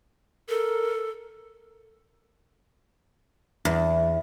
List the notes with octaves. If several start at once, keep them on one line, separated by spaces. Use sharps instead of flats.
A4 A#4
E2